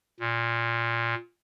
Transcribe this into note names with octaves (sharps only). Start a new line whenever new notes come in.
A#2